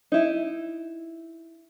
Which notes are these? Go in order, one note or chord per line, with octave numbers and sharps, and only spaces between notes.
D#4 E4